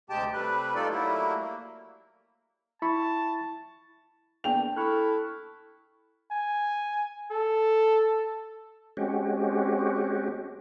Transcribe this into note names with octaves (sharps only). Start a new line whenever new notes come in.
D2 C3 G#3 G4 G5 A5
C3 G3 A3 B4
D#4 F4 A4 D5
F#3 G3 A3 A#3 E4
A#3
E4 A5 B5 C#6
A#3 B3 D4 G#4 G5 F7
E4 A4 C#6 F6 F#6
G#5
A4
G#3 C4 C#4 F#4 G4